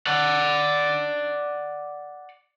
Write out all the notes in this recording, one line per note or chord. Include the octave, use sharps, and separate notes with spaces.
D5 F#5